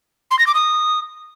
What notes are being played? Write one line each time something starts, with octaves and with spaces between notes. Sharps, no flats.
C6
A#6
D6
D#6